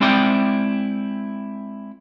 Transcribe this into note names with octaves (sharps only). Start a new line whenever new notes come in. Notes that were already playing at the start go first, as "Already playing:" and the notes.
G#3 C4 E4 D5 G5